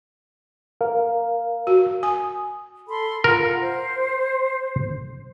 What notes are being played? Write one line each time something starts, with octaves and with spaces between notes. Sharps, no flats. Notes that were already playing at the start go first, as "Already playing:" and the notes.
A#4 F5
F#4
G#5 D#6
A4 B5 C6
F4 A#4 F#5
C5